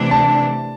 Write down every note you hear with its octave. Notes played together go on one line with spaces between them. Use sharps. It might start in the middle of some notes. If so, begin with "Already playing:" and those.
Already playing: C3 E3 A3 D4
A5